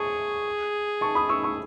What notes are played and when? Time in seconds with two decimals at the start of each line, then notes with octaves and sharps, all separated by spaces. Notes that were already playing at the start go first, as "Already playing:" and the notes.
Already playing: G#4 A5 C#6
1.01 A5 C#6
1.15 B5 D#6
1.29 C#6 E6
1.43 C#6 E6